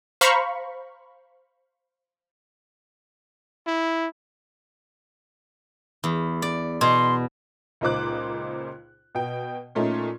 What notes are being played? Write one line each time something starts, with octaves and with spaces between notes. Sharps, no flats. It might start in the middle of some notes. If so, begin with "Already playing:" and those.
C5 F5 A#5 B5 C#6
E4
E2
D5
B2 C6
C#2 A#2 D#4 C5 D6 F#6
B2 G5
A#2 A3 C#4 D#4